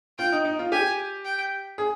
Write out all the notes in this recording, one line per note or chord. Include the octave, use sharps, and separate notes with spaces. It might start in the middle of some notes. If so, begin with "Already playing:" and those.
F4 G5
D#4
D#4
F4
G4 G#5
G5
G#4